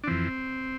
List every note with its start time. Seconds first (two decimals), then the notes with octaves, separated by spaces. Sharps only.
0.04 D4
0.07 F2 E3 C4